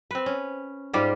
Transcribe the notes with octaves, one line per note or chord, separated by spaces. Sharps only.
C4 B4
C#4
G#2 G3 F4 G4